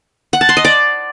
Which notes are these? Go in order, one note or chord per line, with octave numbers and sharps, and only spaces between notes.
F#5
A5
C6
D#5
D5